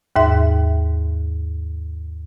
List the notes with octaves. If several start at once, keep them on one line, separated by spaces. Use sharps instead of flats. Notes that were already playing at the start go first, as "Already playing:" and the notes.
D#2 G#2 E5